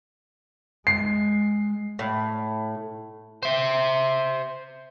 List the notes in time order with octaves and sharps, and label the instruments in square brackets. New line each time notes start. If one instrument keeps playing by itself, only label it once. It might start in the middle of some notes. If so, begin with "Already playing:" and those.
[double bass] G#3 [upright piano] C7
[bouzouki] A2
[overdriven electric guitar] C5 E5